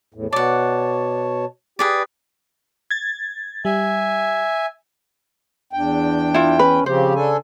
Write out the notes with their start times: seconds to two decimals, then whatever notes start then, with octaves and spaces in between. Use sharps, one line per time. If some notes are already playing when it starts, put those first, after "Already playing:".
0.14 E2 A2
0.33 B2 C#5 D5 F#5 A5
1.79 G4 G#4 B4 D5
2.91 G#6 A6
3.65 G3 E5 G#5
5.73 E2 D4 G5
6.34 E4 F4
6.59 C#4 B4
6.86 C#3 F3 C4 G4 C5
7.15 D4 A4 G#5